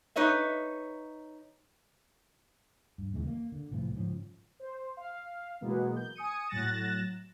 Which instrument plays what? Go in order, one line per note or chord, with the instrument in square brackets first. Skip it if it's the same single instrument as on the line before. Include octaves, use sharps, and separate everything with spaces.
[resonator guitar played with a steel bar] D#4 B4 C#5 D#5 E5
[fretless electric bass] G2
D#2 C#3 E3 G#3
A#3
D3
C2 A2 E3 F3
G#2 C#3 F3 C#4
[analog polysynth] C5
F5
B2 E3 F#3 G#3 A#3 B3
G6
G#5 D#6 C#7 D#7
A2 F#3 F#6 A6 A#6 E7